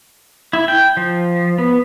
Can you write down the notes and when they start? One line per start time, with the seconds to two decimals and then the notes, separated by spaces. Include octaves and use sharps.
0.53 E4
0.68 G5
0.97 F3
1.58 B3